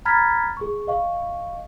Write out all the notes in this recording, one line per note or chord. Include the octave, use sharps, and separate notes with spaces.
A#5 B5 F6 G#6 A6 B6
G#4 C#6
D#5 F5 C#6